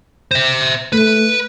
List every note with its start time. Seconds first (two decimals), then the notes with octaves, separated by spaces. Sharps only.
0.31 C5 E5
0.92 A3 B4